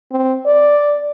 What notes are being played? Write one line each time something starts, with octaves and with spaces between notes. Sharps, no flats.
C4
D5